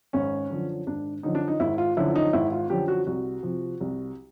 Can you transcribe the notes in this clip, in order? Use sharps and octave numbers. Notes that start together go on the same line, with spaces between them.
G#1 C#4
F#2 D3 F3
G#1 D4
F#2 D3 F3 D#4
D4
D#4
G#1 E4
F4
F#2 D3 F3 E4
D#4
G#1 E4
F4
F#2 D3 F3 G4
F#4
C2 F#4
C3 F3
C2